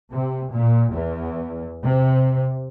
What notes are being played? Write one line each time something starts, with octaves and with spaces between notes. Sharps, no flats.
C3
A#2
E2
C3